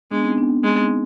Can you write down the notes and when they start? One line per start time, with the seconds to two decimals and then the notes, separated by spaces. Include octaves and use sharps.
0.11 G#3 B3 D4
0.24 C4 D#4
0.37 B3 D4
0.64 G#3 B3 D4
0.80 C4 D#4